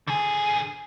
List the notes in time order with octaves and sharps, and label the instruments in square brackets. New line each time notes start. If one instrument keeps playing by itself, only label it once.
[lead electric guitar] D3 G#4